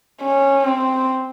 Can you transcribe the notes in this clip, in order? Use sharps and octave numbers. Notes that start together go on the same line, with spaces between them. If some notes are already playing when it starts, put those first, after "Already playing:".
C#4
C4